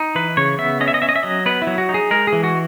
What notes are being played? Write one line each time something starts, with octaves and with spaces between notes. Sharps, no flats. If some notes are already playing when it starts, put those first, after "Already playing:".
Already playing: D#4
E3 B4
C#3 C#5
B3 E5
C#4 D#5
E5
D#5
C#4 E5
D#5
E5
F#3 D#5
B3 B4
E4
F#3
F#4
D#4
G#4
G#3 A#4
G#4
E3
F#4